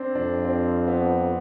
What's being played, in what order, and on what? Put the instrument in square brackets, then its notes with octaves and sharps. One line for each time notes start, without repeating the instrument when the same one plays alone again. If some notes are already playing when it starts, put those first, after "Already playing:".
Already playing: [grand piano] C4 D4
[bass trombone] F2 [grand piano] D4
[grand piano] C4
B3